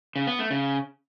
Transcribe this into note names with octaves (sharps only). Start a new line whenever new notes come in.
C#3
B3
A3
C#3